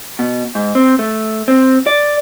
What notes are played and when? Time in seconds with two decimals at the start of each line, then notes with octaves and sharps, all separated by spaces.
0.19 B2
0.55 G#2
0.75 C4
0.99 A3
1.48 C4
1.87 D5